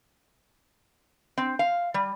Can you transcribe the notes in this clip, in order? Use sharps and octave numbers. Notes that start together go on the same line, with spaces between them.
C4
F5
G3